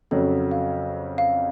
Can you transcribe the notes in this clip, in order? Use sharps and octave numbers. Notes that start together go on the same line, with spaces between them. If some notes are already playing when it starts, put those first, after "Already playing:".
F2 C#3 F#3 A4
F5
F5